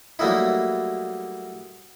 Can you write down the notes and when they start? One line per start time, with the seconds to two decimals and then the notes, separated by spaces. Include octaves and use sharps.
0.19 F#3 G3 A3 A#3 D#4 E4